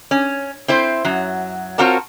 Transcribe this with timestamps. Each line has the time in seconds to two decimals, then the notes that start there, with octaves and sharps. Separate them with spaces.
0.11 C#4
0.68 C4 E4 C5
1.05 F#2 F#3
1.78 C4 F4 F#4 A#4 C#5 A5